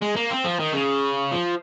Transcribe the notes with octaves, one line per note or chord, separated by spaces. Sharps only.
G#3
A#3
C4
F3
D#3
C#3
F3